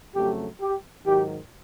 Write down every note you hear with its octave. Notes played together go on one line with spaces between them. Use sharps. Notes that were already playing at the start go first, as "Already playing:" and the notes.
F2 C#3 F#3 A3 G4
G4
G#2 D#3 F#3 G4